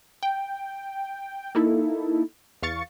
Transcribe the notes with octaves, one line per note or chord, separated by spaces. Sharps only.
G5
A#3 D#4 E4 A4
E2 F5 C#6 A6 C#7